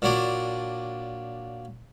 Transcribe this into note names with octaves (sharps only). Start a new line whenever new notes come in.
A#2 F#3 D4